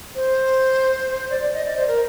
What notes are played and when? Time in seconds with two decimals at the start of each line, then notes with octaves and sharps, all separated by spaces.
0.15 C5
1.30 D5
1.42 D5
1.53 D#5
1.65 D5
1.76 C5
1.87 A#4